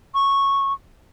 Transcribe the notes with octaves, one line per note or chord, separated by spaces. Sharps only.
C#6